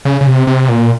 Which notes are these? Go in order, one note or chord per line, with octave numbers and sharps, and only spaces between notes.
C#3
C#3
C3
C3
A#2